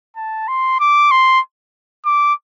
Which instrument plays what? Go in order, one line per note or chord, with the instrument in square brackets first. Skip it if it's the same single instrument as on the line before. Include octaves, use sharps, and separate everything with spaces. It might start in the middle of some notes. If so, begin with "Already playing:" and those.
[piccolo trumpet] A5
C6
D6
C6
D6